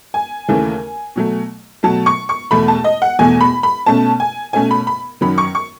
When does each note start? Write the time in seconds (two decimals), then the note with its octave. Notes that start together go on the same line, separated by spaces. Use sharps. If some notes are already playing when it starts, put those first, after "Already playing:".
0.14 G#5
0.48 D#2 C#3 E3 A3 C#4
1.16 B2 F#3 A3
1.83 B2 F#3 A3 A5
2.06 C#6
2.29 C#6
2.51 E2 B2 A3 B5
2.68 A5
2.84 D#5
3.02 F#5
3.19 E2 B2 A3 G#5
3.41 B5
3.63 B5
3.86 B2 A3 C#4 A5
4.20 G#5
4.53 B2 A3 C#4 G#5
4.71 B5
4.87 B5
5.21 F#2 D#3 F#3 C#4 B5
5.38 C#6
5.55 C#6